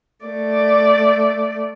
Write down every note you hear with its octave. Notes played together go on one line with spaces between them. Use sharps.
A3 D5